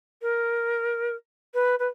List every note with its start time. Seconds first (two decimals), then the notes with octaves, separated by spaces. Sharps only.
0.22 A#4
1.54 B4
1.79 B4